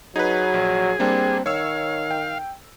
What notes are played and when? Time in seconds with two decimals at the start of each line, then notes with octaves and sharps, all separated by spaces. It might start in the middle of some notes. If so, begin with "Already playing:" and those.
0.16 F#3 D#4 G#4 B4
0.54 A#1
1.00 G3 A#3 C4 D4
1.46 D#3 C#5 F5 E6
2.11 G5